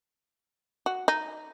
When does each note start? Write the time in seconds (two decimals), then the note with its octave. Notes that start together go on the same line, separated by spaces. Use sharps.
0.86 F#4
1.08 D#4